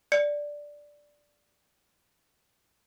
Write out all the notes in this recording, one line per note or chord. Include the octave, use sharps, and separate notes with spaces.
D5 C#7